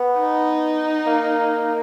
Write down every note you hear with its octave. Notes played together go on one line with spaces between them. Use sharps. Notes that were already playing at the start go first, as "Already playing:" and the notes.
Already playing: B3
D#4
A#3